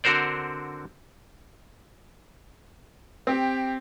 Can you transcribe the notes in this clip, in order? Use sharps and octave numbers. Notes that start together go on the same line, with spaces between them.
D3 C4 F#4 A#4 C5 D5
C4 G4